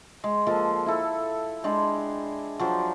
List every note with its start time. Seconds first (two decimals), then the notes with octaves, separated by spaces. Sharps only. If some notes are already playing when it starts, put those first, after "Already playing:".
0.24 G#3
0.46 F3 G#3 A#3 A4
0.86 E4 A4
1.64 G#3 D4 G5
2.59 F3 F#3 C5 D5